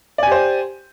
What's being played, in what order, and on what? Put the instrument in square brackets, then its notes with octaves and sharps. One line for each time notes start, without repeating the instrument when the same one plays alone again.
[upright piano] D5
G#5
G4
C5